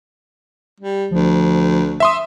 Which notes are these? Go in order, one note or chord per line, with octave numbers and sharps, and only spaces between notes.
G3
D2 F3
E5 C6 D#6